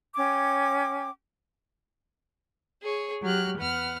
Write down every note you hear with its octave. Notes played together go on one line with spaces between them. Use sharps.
C#4 G5 D6 G#6
G#4 C#5
F#3 G4 F6 F#6
E2 B4 F#5 F6